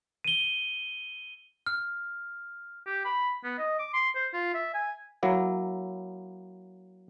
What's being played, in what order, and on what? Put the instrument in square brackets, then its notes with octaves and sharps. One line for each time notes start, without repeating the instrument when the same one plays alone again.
[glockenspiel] D#7 G7
F6
[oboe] G4
B5
B3
D#5
D6
C6
C5
F4
E5
G#5
[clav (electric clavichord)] F#3 A#3 E4